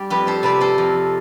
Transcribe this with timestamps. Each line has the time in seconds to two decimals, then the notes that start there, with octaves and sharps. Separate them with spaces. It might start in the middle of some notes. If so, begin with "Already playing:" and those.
Already playing: G3 D5
0.10 F2 G4 B4
0.27 A4 C5
0.43 C3 B4 D5
0.61 A4 C5
0.78 F2